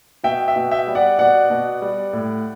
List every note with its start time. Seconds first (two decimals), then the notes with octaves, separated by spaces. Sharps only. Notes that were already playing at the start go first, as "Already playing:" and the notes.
0.24 B2 E5 G5
0.48 E5 G5
0.56 B2
0.71 E5 G5
0.87 G3
0.95 D5 F#5
1.19 B2 D5 F#5
1.50 B2
1.82 G3
2.13 A2